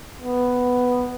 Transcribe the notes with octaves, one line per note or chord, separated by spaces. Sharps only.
B3